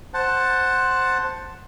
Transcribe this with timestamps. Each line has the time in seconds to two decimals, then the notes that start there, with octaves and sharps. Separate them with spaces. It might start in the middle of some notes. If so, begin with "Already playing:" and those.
0.14 C5 F#5 A5